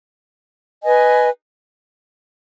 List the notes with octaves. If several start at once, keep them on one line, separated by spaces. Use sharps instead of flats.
B4 D#5 G#5